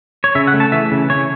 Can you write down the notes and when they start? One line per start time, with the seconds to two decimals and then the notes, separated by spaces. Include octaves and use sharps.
0.24 C#5
0.35 C#3 E5
0.47 F#5
0.54 A3
0.60 A5
0.72 E3 E5
0.91 C#3
1.10 C#3 C#5